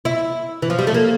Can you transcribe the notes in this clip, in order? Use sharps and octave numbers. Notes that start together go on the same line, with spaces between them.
E4
E3
F3
G3
A3
A#3